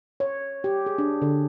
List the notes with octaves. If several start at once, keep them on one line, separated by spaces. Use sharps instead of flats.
C#5
G4
G#4
D4
D3